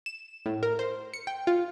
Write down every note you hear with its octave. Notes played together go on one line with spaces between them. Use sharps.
E7
A2
A#4
C5
C#7
G5
F4